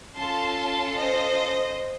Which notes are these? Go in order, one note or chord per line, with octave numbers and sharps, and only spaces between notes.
C#4 F4 A4 A5 C6
C5 D#5